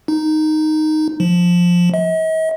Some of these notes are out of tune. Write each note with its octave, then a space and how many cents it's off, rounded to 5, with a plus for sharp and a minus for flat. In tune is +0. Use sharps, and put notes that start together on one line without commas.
D#4 -5
F3 +10
D#5 +45